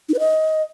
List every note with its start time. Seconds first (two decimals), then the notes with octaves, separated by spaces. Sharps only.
0.09 D#4
0.14 B4
0.19 D#5